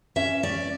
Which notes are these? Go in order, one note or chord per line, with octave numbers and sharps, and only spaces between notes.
C#4 E5
C#4 D5